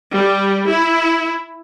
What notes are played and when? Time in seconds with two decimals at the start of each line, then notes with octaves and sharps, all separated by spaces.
0.15 G3
0.69 E4